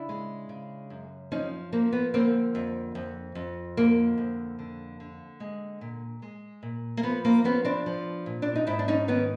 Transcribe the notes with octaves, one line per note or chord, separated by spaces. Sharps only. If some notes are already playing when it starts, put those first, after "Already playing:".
Already playing: C#3 D4 E4
G#3
C#3
F#2
F3 C#4 D#4
F3 A#3
B3
D3 A#3 C4
F2
F2
F2
D3 A#3
F2
D3
D3
G#3
A#2
G#3
A#2
A#3
F3 B3
A#3 C4
F3 B3 C#4
C4 D4
F3
A#2
D4
D#4
G#2 D4 E4
D4
C#4 D#4
D#3 B3 C#4